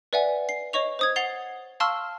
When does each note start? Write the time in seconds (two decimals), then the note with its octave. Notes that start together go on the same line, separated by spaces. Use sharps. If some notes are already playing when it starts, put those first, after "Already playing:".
0.13 B4 D5 E5 F#5 G#5
0.49 C7
0.73 C#5 D#5 C#6 F7
0.99 C5 D#6 G#6
1.16 F#5 A6 C7 F7 G7
1.80 F5 A5 C6 C#6 E6 F6